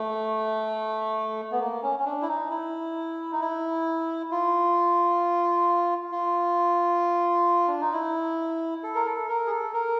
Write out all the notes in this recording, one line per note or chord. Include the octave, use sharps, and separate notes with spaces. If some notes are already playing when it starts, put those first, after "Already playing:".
Already playing: A3
B3
A#3
C#4
C#4
D4
E4
D#4
E4
D#4
E4
F4
F4
D4
D#4
E4
A4
A#4
A4
A#4
G#4
A4
A#4